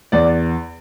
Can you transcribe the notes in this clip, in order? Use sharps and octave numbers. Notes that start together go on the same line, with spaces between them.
E2 D5